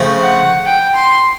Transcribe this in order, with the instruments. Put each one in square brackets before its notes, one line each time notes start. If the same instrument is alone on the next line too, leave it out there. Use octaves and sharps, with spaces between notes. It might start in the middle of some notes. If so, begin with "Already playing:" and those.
Already playing: [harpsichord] C#3 F3 A3 C4
[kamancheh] F#5
G5
C6